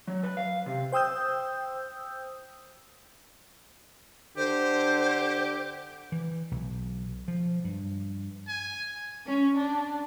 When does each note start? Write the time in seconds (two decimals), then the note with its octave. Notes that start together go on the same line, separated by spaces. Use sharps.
0.07 F#3
0.23 B4
0.37 F5
0.66 C3
0.92 C5 G5 D#6 E6 G6
4.37 D3 G4 C5
6.12 E3
6.51 B1
7.28 F3
7.64 G2
8.48 G#5
9.26 C#4
9.57 D4